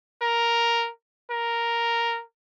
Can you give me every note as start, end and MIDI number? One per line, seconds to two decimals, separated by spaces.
0.22 0.90 70
1.31 2.23 70